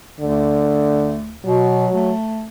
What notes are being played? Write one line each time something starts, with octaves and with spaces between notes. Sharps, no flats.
D2 D3
B2 F#3
A3